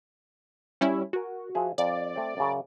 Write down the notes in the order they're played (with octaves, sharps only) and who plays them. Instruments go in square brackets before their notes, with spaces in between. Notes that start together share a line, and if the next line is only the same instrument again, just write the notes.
[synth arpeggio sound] G3 C#4 E4
[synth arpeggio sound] F#4 [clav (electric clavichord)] A#4 G#5
[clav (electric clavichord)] F3 G#4 E5
[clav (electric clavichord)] F2 [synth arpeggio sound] D5
[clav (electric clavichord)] A3 C4
F#2 C#3